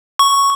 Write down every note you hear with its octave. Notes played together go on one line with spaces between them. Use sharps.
C#6